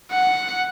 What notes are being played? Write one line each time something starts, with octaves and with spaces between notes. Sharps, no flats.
F#5